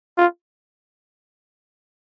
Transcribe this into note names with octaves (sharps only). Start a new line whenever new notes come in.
F4